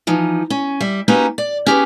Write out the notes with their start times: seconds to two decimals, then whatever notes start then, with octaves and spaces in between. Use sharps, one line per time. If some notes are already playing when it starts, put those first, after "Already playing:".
0.07 E3 F3 D#4
0.50 C#4
0.81 G3 E5
1.08 A#3 C#4 D#4 F#4 G4 B4
1.38 D5
1.66 C#4 G4 G#4 B4